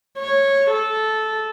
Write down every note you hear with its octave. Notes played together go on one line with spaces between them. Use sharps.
C#5
A4